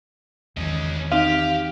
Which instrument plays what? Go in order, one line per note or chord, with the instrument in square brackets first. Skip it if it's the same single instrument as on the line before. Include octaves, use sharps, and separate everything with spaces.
[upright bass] E2 D#3 [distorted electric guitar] C#4 D#5
[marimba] C4 D#4 [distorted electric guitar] G4 [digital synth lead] F5